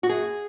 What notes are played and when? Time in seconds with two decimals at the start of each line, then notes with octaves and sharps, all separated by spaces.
0.03 F#4
0.09 F#2 G#4